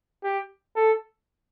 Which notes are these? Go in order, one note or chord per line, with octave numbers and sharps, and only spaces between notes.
G4
A4